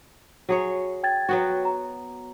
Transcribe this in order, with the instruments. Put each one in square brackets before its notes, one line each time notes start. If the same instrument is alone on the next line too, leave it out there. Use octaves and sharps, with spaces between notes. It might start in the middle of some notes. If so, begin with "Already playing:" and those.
[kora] F#3 G#4 C#5
[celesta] G5 G#6 A6
[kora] F#3 B3 F#4
[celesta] A#5